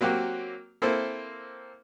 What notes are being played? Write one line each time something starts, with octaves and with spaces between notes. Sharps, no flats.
F#3 A#3 C4 F#4 G4
A#3 C4 E4 A4 C5